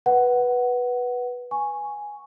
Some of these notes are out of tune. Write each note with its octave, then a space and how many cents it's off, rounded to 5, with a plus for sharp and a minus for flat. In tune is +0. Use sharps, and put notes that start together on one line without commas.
B4 -10 F#5 +10
G#5 +0 C#6 +0